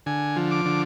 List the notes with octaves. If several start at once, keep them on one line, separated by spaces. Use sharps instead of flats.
D3 G#5
F3
D6
D3